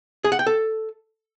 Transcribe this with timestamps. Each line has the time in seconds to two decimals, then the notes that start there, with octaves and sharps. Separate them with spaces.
0.24 G#4
0.32 F#5
0.39 G5
0.47 A4